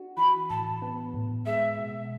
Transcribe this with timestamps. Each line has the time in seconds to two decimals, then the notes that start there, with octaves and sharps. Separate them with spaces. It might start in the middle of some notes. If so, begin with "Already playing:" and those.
Already playing: D4 F#4
0.17 E3 B5
0.50 A2 A5
0.82 B3
1.14 A2
1.46 G#3 E5
1.79 B2